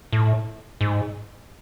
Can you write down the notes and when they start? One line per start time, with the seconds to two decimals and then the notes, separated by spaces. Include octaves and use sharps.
0.13 A2
0.81 G#2